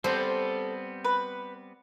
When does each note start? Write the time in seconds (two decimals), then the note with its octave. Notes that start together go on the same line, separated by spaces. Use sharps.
0.04 G3 B3 C4 A4 C5
1.04 B4